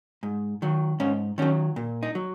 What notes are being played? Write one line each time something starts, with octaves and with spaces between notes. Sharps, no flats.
G#2
D#3 F#3
G#2 C#4
D#3 F#3 C#4
A#2
D#4
F#3